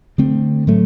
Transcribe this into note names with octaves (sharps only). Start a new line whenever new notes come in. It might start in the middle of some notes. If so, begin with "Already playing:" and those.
D3 A3 C4
A2 F#3 A3